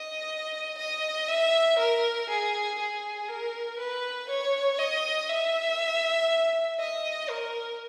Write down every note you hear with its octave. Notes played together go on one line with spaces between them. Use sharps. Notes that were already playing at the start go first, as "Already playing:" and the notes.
Already playing: D#5
D#5
E5
A#4
G#4
G#4
A#4
B4
C#5
D#5
E5
D#5
A#4